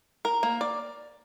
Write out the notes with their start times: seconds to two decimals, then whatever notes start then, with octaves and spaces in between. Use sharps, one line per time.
0.25 A#4
0.43 A#3
0.61 D5